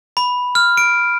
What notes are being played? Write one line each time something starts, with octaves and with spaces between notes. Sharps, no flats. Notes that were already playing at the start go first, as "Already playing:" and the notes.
B5
F6
D7